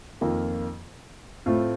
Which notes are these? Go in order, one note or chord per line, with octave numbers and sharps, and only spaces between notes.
F2 D#3 A#3 F4
A2 A3 C4 F4